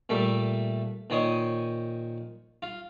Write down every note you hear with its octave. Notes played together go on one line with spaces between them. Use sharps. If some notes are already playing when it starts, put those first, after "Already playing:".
A#2 G3 A3
A#2 D#3 C5 C#5 D#6
F4